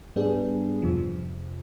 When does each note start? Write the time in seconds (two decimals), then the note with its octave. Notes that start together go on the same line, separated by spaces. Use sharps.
0.16 G#2 G3 B3 D4 G#4
0.82 F2 C3 F3